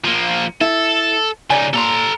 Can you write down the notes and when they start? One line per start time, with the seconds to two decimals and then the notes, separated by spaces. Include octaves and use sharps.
0.04 F3 A#3
0.61 E4 A4
1.50 C#3 D#4 D5 G#5
1.74 A#2 A4 A#5 C6